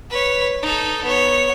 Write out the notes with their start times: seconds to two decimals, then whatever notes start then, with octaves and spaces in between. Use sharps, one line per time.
0.10 B4 C#5
0.63 D#4 A4
1.05 B3 C#5